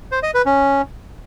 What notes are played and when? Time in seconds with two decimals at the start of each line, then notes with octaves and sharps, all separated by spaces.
0.12 C5
0.23 D#5
0.34 B4
0.46 C#4